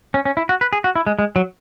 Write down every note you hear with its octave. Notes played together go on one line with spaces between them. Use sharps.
C#4
C#4
E4
F#4
B4
G#4
F#4
E4
G#3
G#3
F#3